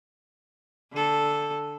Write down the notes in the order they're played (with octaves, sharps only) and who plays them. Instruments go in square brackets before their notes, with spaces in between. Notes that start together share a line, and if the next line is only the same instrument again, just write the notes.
[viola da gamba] D3 A4